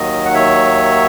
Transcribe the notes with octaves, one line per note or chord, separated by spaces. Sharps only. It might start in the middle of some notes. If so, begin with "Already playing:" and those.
Already playing: D#2 D#3 F#3 D#5
F#5
C#5 E5